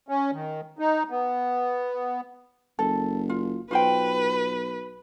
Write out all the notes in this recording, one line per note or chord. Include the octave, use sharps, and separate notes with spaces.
C#4
D#3
D#4
B3
F#1 A4
F4
B1 F4 B4 C5 G5